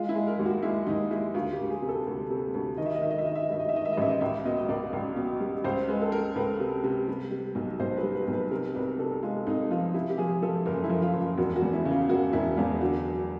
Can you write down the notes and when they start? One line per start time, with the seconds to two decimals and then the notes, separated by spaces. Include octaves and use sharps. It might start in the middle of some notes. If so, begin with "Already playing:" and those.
Already playing: G#3 F4
0.09 E4
0.15 G#3
0.27 A#4
0.39 D#2
0.46 F#4
0.63 G#3 E4
0.87 D#2 D#4
1.11 G#3 E4
1.34 D2 F4
1.52 G4
1.59 D2
1.70 G#4
1.82 C3
1.89 A4
2.07 D2
2.30 C3
2.54 D2
2.77 D#3 D#5
2.86 E5
2.95 D#5
3.01 D#3 E5
3.10 D#5
3.18 E5
3.26 D#3 D#5
3.35 E5
3.43 D#5
3.50 G2 E5
3.59 D#5
3.69 E5
3.74 D#3 D#5
3.85 E5
3.93 D#5
3.97 A1 E5
4.09 D#5
4.21 C#2 E5
4.45 B2 D#5
4.57 D#5
4.69 C#2 D5
4.93 C#2
5.16 B2
5.40 G3
5.64 C#2 C5
5.88 G#3 B4
6.02 A4
6.12 G#3 A#4
6.36 C#2 B4
6.60 C3
6.84 C3
7.08 G3
7.31 G3
7.55 B1
7.80 B1 C5
7.97 B4
8.03 G3
8.15 B4
8.28 B1
8.33 B4
8.51 C3 A#4
8.75 C2 B4
8.99 C3 A4
9.23 G#3 F4
9.47 C2 D#4
9.71 F3 F4
9.94 C3 E4
10.10 G4
10.18 F3 G#4
10.42 F3 A4
10.66 F#1 A#4
10.84 E4
10.89 F3
11.02 F4
11.14 F#1
11.20 F4
11.38 E1 F#4
11.56 F#4
11.62 E2
11.73 E4
11.85 C#3
11.91 F4
12.09 E1 F#4
12.33 E1 E4
12.57 E2 F4
12.80 D3 F#4
13.05 F#3